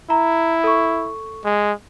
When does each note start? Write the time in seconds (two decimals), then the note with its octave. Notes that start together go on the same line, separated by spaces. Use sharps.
0.10 E4 A#5
0.64 A4 C#6
1.45 G#3